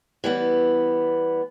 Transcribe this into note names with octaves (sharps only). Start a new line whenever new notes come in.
E3 G3 B3